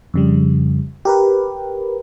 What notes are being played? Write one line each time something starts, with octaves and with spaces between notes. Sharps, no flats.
F2 C#3 G3
G4 A#4 B4